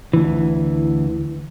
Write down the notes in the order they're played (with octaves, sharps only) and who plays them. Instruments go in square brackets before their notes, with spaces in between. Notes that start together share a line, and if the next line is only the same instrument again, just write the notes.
[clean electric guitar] D2 E3